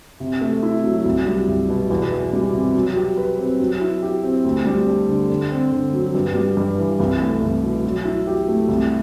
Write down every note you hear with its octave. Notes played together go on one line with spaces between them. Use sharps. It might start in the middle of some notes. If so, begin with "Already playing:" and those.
C3
A3
E4
F#3
C2
G3
C2
B2
E2
E3
G3
C3
F#3
G4
B4
C4
F#3
E4
G4
C4
D2
G3
D4
D3
D3
C4
D3
F#3
G2
G3
G2
E3
C2
A3
C2
B2
F#3
E4
G4
A3
C2